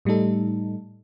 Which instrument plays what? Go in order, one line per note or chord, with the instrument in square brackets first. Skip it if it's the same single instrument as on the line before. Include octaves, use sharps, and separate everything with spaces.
[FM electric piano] A2 G3 A3 D#4 A4